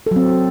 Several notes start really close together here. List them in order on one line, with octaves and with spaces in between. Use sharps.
A4 F#3 C4